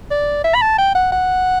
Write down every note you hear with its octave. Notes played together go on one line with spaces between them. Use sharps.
D5
E5
B5
A5
G5
F#5
F#5